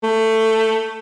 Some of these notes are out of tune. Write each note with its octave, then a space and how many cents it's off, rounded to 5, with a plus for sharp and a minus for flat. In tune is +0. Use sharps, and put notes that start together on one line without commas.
A3 +15